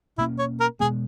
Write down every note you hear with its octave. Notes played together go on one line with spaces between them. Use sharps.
B2 A#3 C#4 E4
C#5
A#4
B2 G#3 B3 G#4